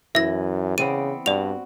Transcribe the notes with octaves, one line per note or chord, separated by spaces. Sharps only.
F#2 E3 E5 A#6
C#3 B3 C4 D5 D#7
G2 F#4 D5 F7